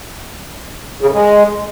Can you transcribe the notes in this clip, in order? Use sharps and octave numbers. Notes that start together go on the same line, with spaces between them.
C#3
F#2
G#3